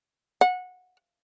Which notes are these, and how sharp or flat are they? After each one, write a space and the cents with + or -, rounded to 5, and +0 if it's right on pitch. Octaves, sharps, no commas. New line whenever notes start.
F#5 -20